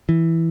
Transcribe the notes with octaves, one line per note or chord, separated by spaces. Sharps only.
E3